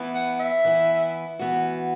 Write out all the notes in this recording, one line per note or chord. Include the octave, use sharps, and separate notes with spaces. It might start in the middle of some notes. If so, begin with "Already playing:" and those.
Already playing: E3 B3 E4
F#5
E5
E3 B3 E4
E3 B3 F#4